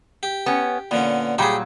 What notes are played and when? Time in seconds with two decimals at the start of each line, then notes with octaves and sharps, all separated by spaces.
0.23 G4
0.46 B3 C#4
0.91 A#2 D3 B3 C#4
1.38 A#2 F#3 G3 G4 G#4